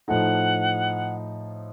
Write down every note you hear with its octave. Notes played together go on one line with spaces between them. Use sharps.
A2 F3 A3 D#4 F#5